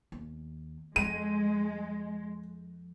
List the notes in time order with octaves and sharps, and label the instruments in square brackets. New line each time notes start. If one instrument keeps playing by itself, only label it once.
[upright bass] D#2
[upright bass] F2 [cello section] G#3 [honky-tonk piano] D#7